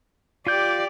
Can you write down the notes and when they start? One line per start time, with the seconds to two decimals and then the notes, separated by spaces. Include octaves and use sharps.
0.47 F4 G4 D5 G6